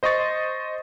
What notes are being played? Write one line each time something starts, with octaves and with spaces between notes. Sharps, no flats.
C5 D#5 C6 C#6 A6